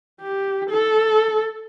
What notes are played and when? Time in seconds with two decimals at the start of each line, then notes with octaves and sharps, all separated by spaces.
0.21 G4
0.70 A4